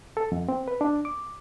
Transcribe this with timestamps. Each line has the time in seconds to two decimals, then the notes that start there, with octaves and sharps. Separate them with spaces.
0.17 A4
0.32 F2
0.49 C4
0.68 B4
0.81 D4
1.05 D6